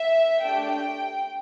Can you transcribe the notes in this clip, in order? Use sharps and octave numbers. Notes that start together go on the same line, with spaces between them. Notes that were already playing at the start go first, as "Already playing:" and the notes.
Already playing: E5
A3 D4 G4 G5